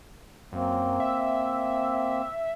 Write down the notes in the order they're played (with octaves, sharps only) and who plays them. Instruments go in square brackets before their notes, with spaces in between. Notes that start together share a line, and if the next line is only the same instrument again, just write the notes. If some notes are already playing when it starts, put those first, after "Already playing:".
[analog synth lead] F#2 [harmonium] A#3 C4
[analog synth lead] E5